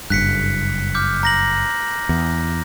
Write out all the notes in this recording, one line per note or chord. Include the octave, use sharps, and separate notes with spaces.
F#1 G2 F#6 B6 C#7
D6 F6 G6
A#5 A#6 F#7
E2